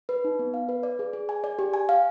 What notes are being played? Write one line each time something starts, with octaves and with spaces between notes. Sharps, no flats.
B4
D#4
B3
F5
B4
D5
G#4
G#4
G#5
D5
G4
G#5
F5